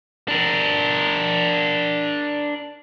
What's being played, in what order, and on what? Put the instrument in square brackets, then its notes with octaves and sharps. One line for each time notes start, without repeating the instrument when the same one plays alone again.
[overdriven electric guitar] D4 A#4